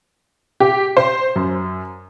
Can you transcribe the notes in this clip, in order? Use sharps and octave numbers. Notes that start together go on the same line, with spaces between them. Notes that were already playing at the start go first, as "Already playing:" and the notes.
G4
C5
F#2